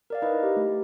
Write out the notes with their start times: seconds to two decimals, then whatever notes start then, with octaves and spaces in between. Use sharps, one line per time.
0.10 A#4 D5 F5
0.22 D#4 E4 B4 D#5
0.43 G4
0.56 A3